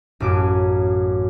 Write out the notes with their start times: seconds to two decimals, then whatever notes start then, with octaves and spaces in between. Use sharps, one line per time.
0.20 A1 F#2 D6